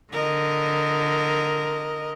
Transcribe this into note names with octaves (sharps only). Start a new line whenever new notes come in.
D3 A#4 D#5